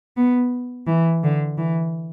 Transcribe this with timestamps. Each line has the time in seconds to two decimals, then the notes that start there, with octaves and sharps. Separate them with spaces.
0.17 B3
0.87 E3
1.24 D3
1.58 E3